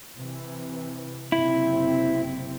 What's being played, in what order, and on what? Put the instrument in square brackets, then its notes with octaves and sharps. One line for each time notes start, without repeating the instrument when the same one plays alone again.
[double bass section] C3 E3
[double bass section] F#1 C3 C4 [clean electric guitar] E4